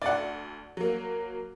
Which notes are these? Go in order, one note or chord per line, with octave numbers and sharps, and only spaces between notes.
D2 D5 F#5
F#3 A#3